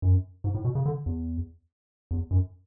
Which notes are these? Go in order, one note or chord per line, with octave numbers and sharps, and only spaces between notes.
F#2
G#2
A2
B2
C#3
D3
E2
E2
F#2